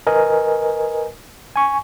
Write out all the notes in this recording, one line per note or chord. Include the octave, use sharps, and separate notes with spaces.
A#4 B4 D#5 G#5
G#5 C#6